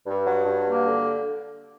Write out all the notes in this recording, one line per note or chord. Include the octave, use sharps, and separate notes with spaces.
G2
F#3
G2
A#3
D3